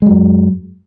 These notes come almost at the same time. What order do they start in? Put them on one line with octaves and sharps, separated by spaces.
G#3 F#3 F#2